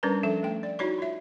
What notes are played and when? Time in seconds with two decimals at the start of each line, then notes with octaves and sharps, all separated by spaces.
0.03 G3 C#4 D4 A#4 B4 A#5
0.23 F3 C#4 A4 E5
0.43 A3 G5
0.63 D5
0.79 D#4 E4 F#4 C#5 B5 C#6
0.98 F4 E5